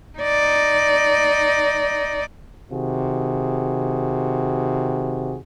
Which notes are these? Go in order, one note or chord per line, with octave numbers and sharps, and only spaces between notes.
D#4 D5
C3 D#3 F#4 G#4